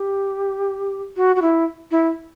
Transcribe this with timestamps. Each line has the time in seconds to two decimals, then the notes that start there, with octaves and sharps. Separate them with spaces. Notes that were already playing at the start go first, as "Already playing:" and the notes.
Already playing: G4
1.17 F#4
1.36 F#4
1.42 E4
1.91 E4